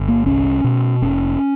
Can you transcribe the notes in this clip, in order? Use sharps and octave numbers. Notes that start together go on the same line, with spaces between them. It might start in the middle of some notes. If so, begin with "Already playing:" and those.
Already playing: G1
A#3
C2 C#4
B2
F1 C#4